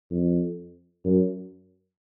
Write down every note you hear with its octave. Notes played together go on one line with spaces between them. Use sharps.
F2
F#2